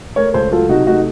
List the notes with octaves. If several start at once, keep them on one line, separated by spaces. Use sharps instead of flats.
A3 A#4 C#5
C#2 A4 C5
F#3 F4 A4
C3 D#4 F#4
A3 D#4 F#4